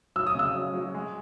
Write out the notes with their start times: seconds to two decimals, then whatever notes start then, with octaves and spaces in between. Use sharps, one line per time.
0.16 F#3 E6
0.27 D#6
0.35 C#3 E6
0.55 F#3
0.74 F#3
0.94 G#3